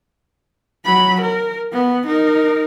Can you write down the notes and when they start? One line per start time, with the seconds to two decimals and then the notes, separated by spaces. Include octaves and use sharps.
0.85 F#3 B5
1.21 A#4
1.73 B3
2.07 D#4 A#4